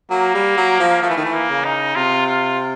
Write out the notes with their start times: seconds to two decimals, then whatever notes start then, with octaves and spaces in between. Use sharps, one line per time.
0.10 F#3 A#3
0.34 G3
0.57 F#3
0.80 F3
1.03 F3 A3
1.10 E3
1.17 D#3
1.25 E3
1.34 A#3
1.49 C#3
1.65 D#4
1.95 C3 F4
2.26 F4